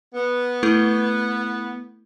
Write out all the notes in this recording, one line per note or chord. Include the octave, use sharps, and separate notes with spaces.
B3
A3 E4 A4